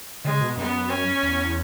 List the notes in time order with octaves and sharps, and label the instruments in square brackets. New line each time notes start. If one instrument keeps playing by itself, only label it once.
[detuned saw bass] C#3 [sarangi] G#3
[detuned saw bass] B2
[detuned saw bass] F#2 [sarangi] B3
[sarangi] C#4
[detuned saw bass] E2